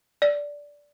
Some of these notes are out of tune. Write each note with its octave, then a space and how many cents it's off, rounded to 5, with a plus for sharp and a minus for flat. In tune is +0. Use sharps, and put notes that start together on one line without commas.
D5 -10